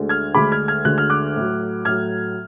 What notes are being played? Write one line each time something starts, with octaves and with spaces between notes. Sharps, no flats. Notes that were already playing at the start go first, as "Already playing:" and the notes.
Already playing: D2 D3 G#3
F6 G#6
D2 D3 G#3 B5 D6
F6 G#6
F6 G#6
D2 D3 G#3 F#6
F6
D6 F#6
A2 F#3
A2 F#3 F6 G#6